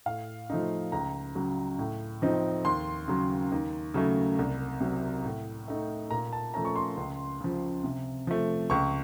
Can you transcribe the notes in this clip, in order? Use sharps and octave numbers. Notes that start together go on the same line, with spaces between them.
A2 F5
F3 A3 D#4
C#2 A#5
C#3 F#3
A2
F3 C4 D#4
D#2 C6
C#3 F#3
D#2
C#3 F#3 A3
C2
C3 F#3
A2
A3 D#4
A#2 A#5
A5
F3 A3 C#4 A#5
C#6
C6
C#2
C#3 F3
C3
F3 A3
C#2 C#6